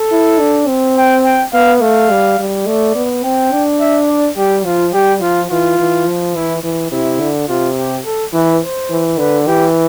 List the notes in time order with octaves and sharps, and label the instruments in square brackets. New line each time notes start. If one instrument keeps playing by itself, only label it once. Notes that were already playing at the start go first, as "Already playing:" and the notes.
Already playing: [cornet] A4
[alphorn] E4
D4
C4
[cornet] G5
G5
[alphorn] B3 [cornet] F5
[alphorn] A3 [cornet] F5
[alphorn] G3
G3
[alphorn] A3 [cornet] D5
[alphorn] B3
[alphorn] C4 [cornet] G5
[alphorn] D4
[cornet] E5
D5
[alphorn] G3 [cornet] G4
[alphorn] F3 [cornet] F4
[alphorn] G3 [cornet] G4
[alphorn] F3 [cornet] F4
[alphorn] E3 [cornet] F4
[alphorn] E3
F3
[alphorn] E3 [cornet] E4
[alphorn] E3
[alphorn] C3 [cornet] E4
[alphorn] D3
[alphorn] C3 [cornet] F4
[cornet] G4
A4
[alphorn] E3 [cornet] B4
[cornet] C5
[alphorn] E3
[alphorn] D3 [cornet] B4
[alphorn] E3 [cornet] G4